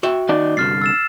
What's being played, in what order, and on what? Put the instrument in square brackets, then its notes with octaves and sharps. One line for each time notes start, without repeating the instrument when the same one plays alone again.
[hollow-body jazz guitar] F#4 E5 G5
[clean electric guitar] D#2 D#4 D5
[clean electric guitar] C2 G2 D3 [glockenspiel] F6 A6 C7
[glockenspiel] E6 A6 E7